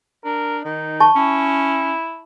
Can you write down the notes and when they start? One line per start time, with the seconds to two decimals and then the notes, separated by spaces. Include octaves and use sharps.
0.25 D4 A#4
0.65 D#3 D#4
1.00 A5 C#6
1.16 C#4 E4